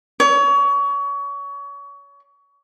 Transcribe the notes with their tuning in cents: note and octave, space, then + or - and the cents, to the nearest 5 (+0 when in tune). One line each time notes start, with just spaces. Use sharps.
C#5 +25